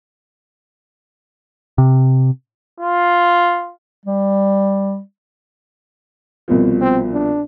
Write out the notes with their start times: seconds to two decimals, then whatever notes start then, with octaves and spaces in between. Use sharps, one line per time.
1.78 C3
2.81 F4
4.06 G3
6.48 C2 B2 F3
6.81 C4
7.13 D4